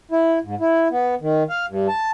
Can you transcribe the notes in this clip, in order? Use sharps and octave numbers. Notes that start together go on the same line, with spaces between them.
E4
G#2
E4
B3
D#3
F5
G2
A5